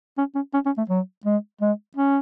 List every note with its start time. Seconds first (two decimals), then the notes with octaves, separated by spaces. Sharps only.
0.18 C#4
0.35 C#4
0.54 C#4
0.66 C#4
0.77 A3
0.90 F#3
1.25 G#3
1.61 G#3
1.96 C#4